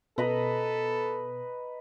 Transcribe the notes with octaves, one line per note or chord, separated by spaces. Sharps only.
B2 A4 B4 D#5 A#5